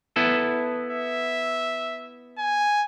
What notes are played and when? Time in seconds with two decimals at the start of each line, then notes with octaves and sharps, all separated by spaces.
0.16 B3 E4 A4
0.90 E5
2.38 G#5